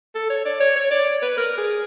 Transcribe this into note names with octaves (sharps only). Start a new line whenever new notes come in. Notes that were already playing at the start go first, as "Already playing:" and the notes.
A4
C#5
D5
C#5
C#5
D5
B4
A#4
G#4